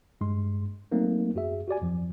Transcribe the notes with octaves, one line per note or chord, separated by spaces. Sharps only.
G2 G#3 C6
F#3 A3 A#3 C4 D#4
F#2 F#4 G#4 E5
F#4 G4 D5 G#5
F2 F3